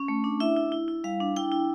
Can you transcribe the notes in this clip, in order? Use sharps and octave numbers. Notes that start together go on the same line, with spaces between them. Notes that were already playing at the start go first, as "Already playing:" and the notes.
Already playing: C#4
A3
D4
E4 E5
E4
E4
E4
G3 F5
D4
E4 G5
E4